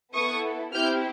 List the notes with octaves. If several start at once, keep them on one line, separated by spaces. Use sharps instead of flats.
B3 E4 A4 C#6 D#6
C4 E4 G4 F6 G6